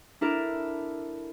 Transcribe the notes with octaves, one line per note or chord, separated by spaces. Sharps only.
D4 E4 A4 A#4